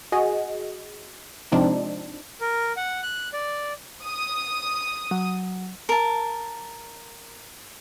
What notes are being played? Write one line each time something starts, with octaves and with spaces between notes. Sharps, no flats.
F#4 G#4 D#5
G#2 C3 F3 C4 D4 D#4
A#4
F#5
F#6
D5
D#6
F#3
A#4 A5